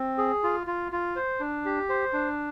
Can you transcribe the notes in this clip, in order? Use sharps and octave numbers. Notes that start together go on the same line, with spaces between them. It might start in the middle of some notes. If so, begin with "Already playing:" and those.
Already playing: C4
G#4
F4
F4
F4
C5
D4
G4
C5
D4